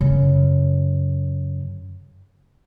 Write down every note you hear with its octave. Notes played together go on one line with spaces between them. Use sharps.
F#2 C#3